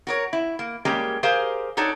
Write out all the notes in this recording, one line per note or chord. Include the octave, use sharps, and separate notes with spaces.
F#4 A#4 C#5
E4
A#3
G3 G#3 A#3 C#4 G4
G4 G#4 A#4 C5 F5
D4 D#4 F#4 A4 C#5